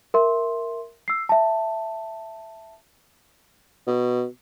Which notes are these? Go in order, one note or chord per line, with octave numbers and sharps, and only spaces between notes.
A#4 E5 C6
E6 C7
E5 A5
B2